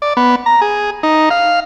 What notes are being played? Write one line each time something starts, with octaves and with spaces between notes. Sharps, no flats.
D5
B3
A#5
G#4
D#4
F5